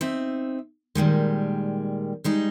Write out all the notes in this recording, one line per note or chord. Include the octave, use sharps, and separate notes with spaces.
C4 D#4 E5
A#2 D#3 G3 G#3
G3 G#3 D#4